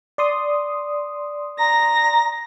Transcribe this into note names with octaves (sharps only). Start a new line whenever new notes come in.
D5 C6 D#6
A#5 A#6